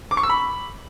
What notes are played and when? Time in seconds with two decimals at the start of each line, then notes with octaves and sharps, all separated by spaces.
0.11 D6
0.17 C#6
0.23 E6
0.30 B5